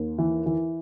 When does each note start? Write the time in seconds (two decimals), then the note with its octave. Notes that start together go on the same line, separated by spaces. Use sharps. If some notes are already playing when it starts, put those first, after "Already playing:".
Already playing: D#2
0.18 E3
0.46 E3